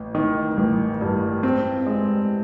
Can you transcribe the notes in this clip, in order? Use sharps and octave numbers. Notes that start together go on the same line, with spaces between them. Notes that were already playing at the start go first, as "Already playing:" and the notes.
Already playing: A1
D#3
A1
G2
C4
G#3